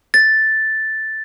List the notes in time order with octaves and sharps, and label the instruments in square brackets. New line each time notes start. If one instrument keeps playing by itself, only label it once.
[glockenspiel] A6